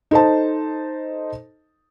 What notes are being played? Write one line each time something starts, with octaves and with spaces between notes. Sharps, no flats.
D#4 A4 C5 D#5 A5